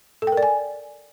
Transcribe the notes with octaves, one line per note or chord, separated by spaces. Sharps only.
A4
G5
A#4
D5
G#5